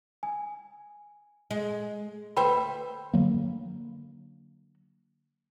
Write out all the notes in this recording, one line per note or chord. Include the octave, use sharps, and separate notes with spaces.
G#5
G#3
D2 B4 C5 E5 G5 B5
D3 F#3 A#3